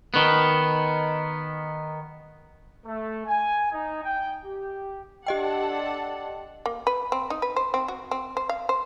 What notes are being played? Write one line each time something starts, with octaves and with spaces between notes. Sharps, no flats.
D#3 B3
A3
G#5
D#4
G5
G4
D4 G4 A4 D#5 F#5 G5
A#3
B4
C4
D#4
B4
C5
C4
F#4
C4
C5
F5
C5